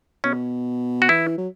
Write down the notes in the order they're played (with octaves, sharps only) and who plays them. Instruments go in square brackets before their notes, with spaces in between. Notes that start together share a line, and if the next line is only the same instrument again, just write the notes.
[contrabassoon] B2 [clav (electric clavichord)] C#4
[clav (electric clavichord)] F#4
[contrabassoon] E3 [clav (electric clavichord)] E4
[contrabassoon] F#3